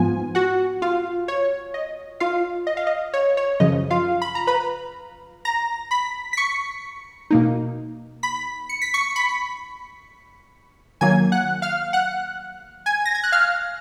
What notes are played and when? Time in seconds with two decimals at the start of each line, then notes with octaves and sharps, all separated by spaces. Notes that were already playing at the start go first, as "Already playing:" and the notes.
Already playing: G#2 F3 B3 F4 G#5
0.35 F#4 F#5
0.82 F4 F5
1.28 C#5
1.74 D#5
2.20 F4 F5
2.67 D#5
2.77 F5
2.87 D#5
3.14 C#5
3.37 C#5
3.60 F#2 C#3 F3 D#5
3.91 F4 F5
4.22 B5
4.35 A#5
4.47 B4 B5
5.45 A#5 A#6
5.91 B5 B6
6.33 B6
6.37 C#6 C#7
7.31 B2 A#3 D#4
8.23 B5 B6
8.69 C#7
8.82 B6
8.94 C#6 C#7
9.16 B5 B6
11.01 D#3 F#3 A#3 G#5 G#6
11.32 F#5 F#6
11.62 F5 F6
11.93 F#5 F#6
12.86 G#5 G#6
13.05 A#6
13.15 G#6
13.24 F#6
13.32 F5 F6